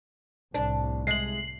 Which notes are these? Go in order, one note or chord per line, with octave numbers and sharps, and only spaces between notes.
C2 A2 D4
G#3 C7 F#7